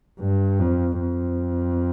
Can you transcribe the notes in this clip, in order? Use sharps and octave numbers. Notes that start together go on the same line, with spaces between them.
G2
F2
F2